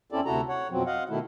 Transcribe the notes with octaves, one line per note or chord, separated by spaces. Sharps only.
E2 C4 C#4 E4 A4 D5
D2 C3 E4 F#4 A4 A#5
C#5 F#5
F2 B2 F3 F#3 C4
D#5 F5 F#5
B2 D#3 A3 E4